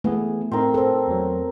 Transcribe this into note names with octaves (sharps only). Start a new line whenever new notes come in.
E3 A3 B3 G#4
A2 C4 D#4 A#4
A4 C5
E2 F#3